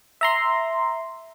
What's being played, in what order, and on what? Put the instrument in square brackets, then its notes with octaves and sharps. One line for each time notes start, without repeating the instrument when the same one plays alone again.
[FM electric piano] E5 A#5 C6